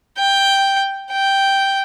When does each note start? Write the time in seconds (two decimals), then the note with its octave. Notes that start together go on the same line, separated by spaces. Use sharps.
0.18 G5
1.12 G5